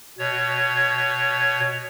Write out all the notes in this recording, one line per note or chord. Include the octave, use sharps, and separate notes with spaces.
B2 C#5